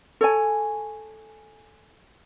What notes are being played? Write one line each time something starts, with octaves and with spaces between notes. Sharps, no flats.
A4 C#5 G#5